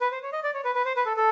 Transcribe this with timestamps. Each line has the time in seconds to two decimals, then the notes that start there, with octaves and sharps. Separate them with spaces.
0.01 B4
0.11 C5
0.23 C#5
0.33 D#5
0.43 D5
0.54 C#5
0.65 B4
0.75 B4
0.85 C5
0.96 B4
1.06 A4
1.16 A4